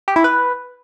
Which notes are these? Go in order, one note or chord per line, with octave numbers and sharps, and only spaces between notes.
G4
E4
B4